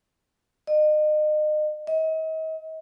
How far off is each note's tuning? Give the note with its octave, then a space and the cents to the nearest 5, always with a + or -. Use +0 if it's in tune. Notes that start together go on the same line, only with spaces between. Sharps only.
D#5 -35
D#5 +40